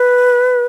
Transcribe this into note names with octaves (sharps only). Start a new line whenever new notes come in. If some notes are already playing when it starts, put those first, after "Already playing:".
Already playing: B4